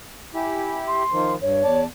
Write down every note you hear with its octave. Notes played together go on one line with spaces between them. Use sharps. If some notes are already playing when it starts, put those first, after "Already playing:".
E4 G4 G#5
C6
D#3 F3
G2 C#5
E2 D5 A5